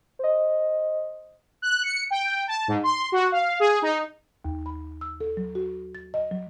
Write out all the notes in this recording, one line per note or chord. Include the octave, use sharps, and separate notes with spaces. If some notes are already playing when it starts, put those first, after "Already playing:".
C5 D#5
F#6
C#7
G5
A5
G#2
C6
F#4
F5
G#4
D#4
D#2
B5
E6
A4
F#3
F#4
A6
D#5
F#3